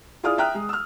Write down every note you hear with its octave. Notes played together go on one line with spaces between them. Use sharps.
E4 F4 G#4 D5 D#6 F6
E5 G5 A#5 F6 F#6
G#3
E6 F6